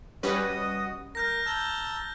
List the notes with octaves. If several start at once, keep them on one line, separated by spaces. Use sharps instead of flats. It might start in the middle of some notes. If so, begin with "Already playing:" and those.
G3 C#4 F#4 B4 D#5 D#6
A#4 F6 G6 A#6
A5 A#5 E6 F6 G6 G7